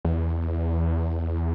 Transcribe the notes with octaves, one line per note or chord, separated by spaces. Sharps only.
E2